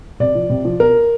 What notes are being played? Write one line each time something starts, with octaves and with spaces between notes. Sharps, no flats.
C3 D5
F3
C3
F3
B2 A#4